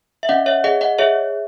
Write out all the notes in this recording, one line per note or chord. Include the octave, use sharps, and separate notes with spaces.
E5
C#4 D#5 F#5
C#5 E5
G#4 D#5 F#5
D#5 F#5
G#4 C#5 E5